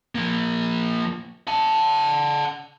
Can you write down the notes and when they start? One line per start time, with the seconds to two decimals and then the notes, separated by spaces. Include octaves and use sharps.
0.15 F3 A#3
1.47 F#5 A5